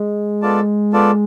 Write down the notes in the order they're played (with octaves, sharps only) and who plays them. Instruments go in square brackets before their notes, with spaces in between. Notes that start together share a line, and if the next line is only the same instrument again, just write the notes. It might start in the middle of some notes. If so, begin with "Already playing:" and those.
Already playing: [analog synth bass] G#3
[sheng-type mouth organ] B3 F4 A4 D5 A5
B3 F4 A4 D5 A5